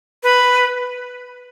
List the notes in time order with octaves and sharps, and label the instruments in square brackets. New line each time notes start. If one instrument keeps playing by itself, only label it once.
[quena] B4